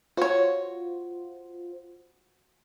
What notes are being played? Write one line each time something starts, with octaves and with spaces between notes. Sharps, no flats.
F4 F#4 C5 C#5